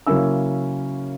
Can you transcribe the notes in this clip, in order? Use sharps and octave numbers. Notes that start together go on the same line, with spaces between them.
C#3 F#3 A#3 C#4 E4 E6